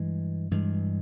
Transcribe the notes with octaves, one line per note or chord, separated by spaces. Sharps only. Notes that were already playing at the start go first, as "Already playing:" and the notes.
Already playing: G2 E3 G#3
G2 E3 G#3